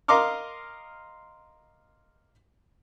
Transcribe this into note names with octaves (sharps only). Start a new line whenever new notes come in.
A#4 D#5 F5 C6 D6 F6